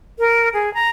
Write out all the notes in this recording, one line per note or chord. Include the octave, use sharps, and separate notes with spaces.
A#4
G#4
A#5